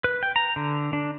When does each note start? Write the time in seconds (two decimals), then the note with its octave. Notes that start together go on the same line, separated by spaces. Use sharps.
0.04 B4
0.23 G5
0.36 A#5
0.56 D3
0.93 D4